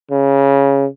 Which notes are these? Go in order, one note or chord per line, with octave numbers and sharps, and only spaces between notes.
C#3